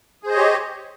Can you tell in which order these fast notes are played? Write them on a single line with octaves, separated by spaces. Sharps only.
G#4 C5 D#5 C#5 G4